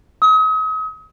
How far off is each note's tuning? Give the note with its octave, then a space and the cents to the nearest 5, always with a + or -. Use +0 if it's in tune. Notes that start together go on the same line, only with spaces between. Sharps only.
D#6 +40